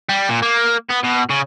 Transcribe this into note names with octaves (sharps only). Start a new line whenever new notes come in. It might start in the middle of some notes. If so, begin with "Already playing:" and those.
G3
A#2
A#3
B3
B2
C#3